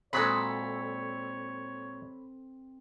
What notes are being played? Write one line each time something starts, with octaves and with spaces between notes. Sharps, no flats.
A#2 F#3 G#3 C4 A4 C#5 B5 B6